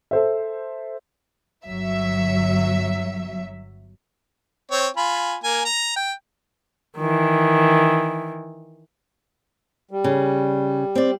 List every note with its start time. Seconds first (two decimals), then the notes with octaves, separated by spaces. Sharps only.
0.11 A4 C5 E5
1.66 G1 F#3 E5
4.71 C4 C#5
4.97 F4 G#5 B5
5.44 A#3 G#5
5.65 A#5
5.96 G5
6.98 D#3 E3
9.91 G3
10.04 C#3
10.95 C4 D5